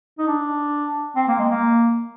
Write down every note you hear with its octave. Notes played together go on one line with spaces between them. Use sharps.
D#4
D4
C4
A#3
G#3
A#3